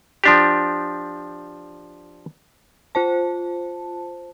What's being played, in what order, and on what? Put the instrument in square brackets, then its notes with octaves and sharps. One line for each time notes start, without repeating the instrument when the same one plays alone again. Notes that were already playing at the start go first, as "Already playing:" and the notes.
[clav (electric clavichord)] F3 D4 G4
[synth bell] F4 C5 A5